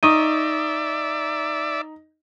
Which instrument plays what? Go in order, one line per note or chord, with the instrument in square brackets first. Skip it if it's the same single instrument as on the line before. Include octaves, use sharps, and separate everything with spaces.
[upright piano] D#4 [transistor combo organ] D5 E5 [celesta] C#6 D#6 D#7